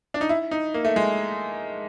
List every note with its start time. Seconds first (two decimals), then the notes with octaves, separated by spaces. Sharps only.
0.14 D4
0.21 D#4
0.29 E4
0.51 D#4
0.74 A#3
0.85 A3
0.96 G#3